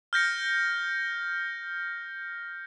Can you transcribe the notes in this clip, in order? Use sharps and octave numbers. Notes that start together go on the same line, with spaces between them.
F6 G6 A#6 C#7